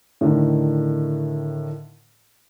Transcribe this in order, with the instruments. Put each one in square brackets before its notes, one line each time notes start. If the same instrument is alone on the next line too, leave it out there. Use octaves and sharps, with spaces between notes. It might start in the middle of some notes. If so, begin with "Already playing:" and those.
[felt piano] A2 D3 D#3